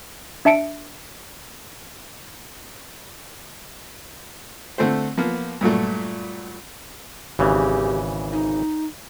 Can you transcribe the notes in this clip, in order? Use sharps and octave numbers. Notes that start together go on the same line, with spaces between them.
D4 E5 A5 C#7 D7
D3 A3 C4 C5
F3 A#3 B3
G2 A#2 F#3 A3
G#1 C#3 E3 G4
D#4